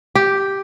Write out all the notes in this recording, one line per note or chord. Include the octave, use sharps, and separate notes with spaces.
G4